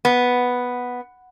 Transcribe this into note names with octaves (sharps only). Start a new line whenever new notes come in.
B3